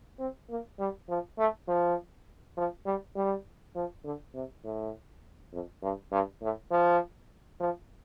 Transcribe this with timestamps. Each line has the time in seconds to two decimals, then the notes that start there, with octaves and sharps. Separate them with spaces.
0.19 C4
0.50 A#3
0.79 G3
1.08 F3
1.38 A3
1.67 F3
2.57 F3
2.86 G3
3.16 G3
3.75 F3
4.04 D3
4.34 C3
4.64 A2
5.53 F2
5.82 G2
6.11 G2
6.41 A2
6.71 F3
7.60 F3